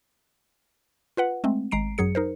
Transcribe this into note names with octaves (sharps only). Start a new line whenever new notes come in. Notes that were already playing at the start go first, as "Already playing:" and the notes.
F4 B4 F#5
G#3 A3 C4
G#1 G#3 A#5 C7 D7
F#2 F#3 G#4 C#7
D#4 A#4 C5